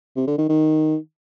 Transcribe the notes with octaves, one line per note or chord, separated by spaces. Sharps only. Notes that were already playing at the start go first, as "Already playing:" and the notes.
C3
D3
D#3
D#3